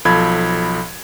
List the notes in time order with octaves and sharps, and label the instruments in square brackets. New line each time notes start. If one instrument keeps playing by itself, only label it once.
[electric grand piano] B1 F3 A4 B5 G#6